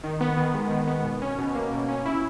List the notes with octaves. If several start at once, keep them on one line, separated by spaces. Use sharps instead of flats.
D#3
B3
D#3
G#3
D#3
B3
B2
C#4
B2
A#3
B2
C#4
E4